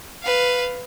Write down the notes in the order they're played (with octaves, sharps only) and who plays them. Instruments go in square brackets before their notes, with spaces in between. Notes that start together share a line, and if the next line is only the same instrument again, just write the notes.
[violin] B4 F5